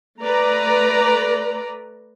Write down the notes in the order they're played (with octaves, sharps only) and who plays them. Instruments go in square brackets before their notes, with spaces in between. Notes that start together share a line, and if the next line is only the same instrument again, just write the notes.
[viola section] A3 B4 D5 A#5